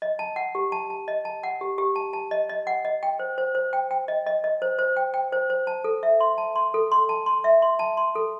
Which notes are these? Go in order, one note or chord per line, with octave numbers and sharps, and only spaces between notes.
D#5
A5
F#5
G4
A5
A5
D#5
A5
F#5
G4
G4
A5
A5
D#5
D#5
F#5
D#5
G5
C5
C5
C5
G5
G5
D#5
D#5
D#5
C5
C5
G5
G5
C5
C5
A5
A4
E5
C6
A5
C6
A4
C6
A5
C6
E5
C6
A5
C6
A4